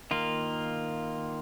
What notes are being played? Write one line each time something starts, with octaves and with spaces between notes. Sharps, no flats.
D#3 A#3 F4